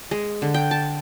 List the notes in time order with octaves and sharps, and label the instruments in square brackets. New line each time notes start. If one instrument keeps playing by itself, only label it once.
[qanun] G#3
D3
G5
A5